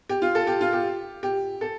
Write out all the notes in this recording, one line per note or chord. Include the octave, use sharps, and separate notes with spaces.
G4
F4
A4
G4
F4
G4
G4
A4